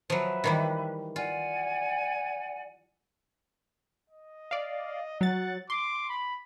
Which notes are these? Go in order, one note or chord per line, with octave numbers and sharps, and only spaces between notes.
F3 F#3 B4 E5
D#3 E3 G3
F4 D5 F#5 G#5
D#5
D5 F5
F#3 F#5 A6
C6 D6
B5